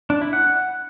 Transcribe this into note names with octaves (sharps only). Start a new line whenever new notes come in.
D4
E4
F#5